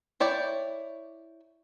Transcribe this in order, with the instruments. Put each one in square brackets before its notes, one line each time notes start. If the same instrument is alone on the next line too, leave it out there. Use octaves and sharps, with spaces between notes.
[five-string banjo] E4 C#5 D5 G5